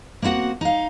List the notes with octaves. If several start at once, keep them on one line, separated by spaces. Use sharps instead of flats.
A#3 C4 E4 F#4 F#5
D#4 F5